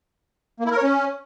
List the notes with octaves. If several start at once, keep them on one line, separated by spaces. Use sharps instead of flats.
A#3
E4
A#4
C#5
C#4